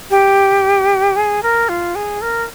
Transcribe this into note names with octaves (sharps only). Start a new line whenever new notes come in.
G4
G#4
A#4
F4
G#4
A#4